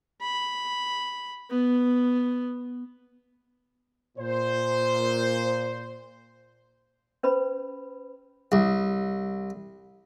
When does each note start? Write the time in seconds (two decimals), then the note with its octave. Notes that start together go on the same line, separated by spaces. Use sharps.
0.22 B5
1.51 B3
4.18 A#2 C5
7.23 C#4 B4 C5 B5
8.52 C2